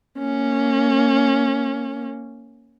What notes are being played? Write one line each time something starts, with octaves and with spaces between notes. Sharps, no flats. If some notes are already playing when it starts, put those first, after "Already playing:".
A#3 C#4